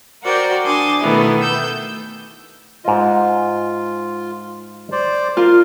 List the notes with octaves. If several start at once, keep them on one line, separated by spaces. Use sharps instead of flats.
F#4 A#4 C5 D5 G5
D4 G#5 A5 C6 D6 D#6
B2 D#3 A3 B3 E4
E6 G6
G#2 F4 D#5
C5 D5
F4 A#4